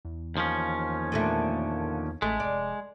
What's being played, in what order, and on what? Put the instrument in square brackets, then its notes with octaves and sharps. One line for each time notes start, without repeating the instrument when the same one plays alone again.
[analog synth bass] E2
[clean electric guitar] D#2 F3 C#4
[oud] A#2 D3 A3
[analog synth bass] A1 [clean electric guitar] G#3 [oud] A3
[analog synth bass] F1 [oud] D5